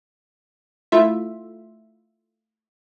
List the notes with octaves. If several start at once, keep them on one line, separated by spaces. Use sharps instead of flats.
A3 E4 F4 E5